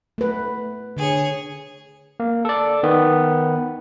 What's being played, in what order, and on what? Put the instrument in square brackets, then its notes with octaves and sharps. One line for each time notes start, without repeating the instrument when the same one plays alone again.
[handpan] A3 B4
[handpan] D3 [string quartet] G#4 C#5
[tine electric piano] A#3
A4 D5
D#3 B3